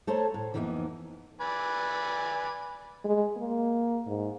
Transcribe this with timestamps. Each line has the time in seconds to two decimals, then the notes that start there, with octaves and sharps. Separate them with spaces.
0.07 A3 A4 C5 C#5 A5 A#5
0.34 A2
0.54 F2 E3 A#3 B3 C#4 D#4
1.41 B4 D5 G#5
3.04 G#3
3.37 A#3
4.07 G#2